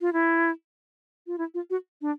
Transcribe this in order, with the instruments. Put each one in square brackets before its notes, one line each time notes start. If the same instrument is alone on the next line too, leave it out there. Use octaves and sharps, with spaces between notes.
[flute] F4
E4
F4
E4
F4
F#4
D4